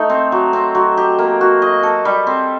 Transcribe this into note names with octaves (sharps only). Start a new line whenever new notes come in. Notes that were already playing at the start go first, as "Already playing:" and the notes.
Already playing: A3 D#4
C4
F#3
C4
F#3
G4
A#3
F#4
D#5
A4
G3
C4